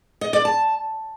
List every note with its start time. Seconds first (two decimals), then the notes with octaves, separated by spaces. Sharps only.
0.21 D#5
0.33 D5
0.45 A5